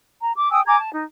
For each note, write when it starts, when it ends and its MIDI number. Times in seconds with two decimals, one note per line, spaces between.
0.20 0.32 82
0.36 0.50 86
0.50 0.60 79
0.50 0.60 80
0.50 0.60 87
0.50 0.60 88
0.66 0.76 80
0.66 0.76 82
0.66 0.76 86
0.66 0.76 92
0.79 0.90 81
0.92 1.03 63